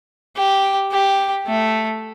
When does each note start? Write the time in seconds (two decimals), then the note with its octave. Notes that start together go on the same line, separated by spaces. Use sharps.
0.36 G4
0.92 G4
1.47 A3